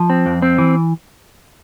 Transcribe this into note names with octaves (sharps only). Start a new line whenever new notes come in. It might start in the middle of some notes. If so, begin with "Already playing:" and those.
Already playing: F3
C4
F2
C4
E3